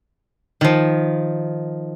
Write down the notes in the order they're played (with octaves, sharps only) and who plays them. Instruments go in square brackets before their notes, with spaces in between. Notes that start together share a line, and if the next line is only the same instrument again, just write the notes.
[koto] D#3 F3